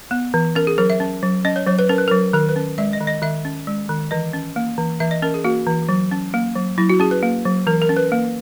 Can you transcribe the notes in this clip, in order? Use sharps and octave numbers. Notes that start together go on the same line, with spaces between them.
B3
E3
C#4 A#4
G#4
F#3 A#4
E5
C#4
F#3
C#4 D#5
C#5
F#3 C#5
B4
C#4 A#4
B4
F#3 A#4
D#3 A#4
B4
C#4
G#3 E5
D#5
D#3
D#5
D#3 E5
C#4
G#3
D#3
E3 D#5
C#4
A#3
E3
E3 E5
D#5
C#4 A#4
G#4
A#3 F#4
E3
F#3
C#4
A#3
F#3
F#3 E4
F#4
C#4 G#4
B4
A#3
F#3
E3 A#4
A#4
C#4
B4
A#3